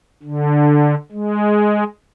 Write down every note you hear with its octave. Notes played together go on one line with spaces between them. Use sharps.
D3
G#3